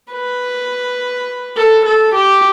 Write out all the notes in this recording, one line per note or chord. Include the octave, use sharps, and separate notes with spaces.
B4
A4
A4
G4